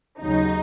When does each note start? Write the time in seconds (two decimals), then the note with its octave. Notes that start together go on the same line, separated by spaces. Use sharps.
0.20 D#2 C#3 F#3 D#4